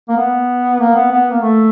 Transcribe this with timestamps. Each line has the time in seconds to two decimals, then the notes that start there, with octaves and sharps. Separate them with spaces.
0.09 A#3
0.17 B3
0.80 A#3
0.95 B3
1.11 B3
1.31 A#3
1.42 A3